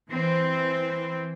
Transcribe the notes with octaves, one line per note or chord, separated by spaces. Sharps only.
E3 C4